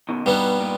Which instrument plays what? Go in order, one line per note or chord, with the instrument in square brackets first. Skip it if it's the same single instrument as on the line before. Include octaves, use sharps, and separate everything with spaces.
[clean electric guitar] B2 D#3
[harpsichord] G2 G3 B3 D#4 [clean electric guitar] B2
[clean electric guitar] A#2